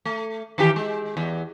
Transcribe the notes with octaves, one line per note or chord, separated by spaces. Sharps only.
A3
D#3 E3 G4
G#3
E2